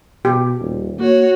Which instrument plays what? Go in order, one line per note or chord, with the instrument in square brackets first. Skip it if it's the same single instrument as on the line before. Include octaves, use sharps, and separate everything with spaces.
[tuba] B2 [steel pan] G4
[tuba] D#1
[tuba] A#3 [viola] F#4 C#5